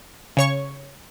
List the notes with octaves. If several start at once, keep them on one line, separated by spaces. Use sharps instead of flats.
C#3 C#5 C#6